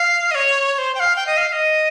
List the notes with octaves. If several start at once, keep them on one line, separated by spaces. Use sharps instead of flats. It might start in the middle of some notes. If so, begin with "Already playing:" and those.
Already playing: F5
D#5
C#5
C#5
C5
G5
F5
G5
D#5
F5
F5
D#5